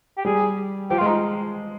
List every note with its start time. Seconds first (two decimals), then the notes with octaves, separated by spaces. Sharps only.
0.17 G4
0.25 G3 G#4
0.90 F3 G4
0.98 F4
1.01 G#3
1.07 D#4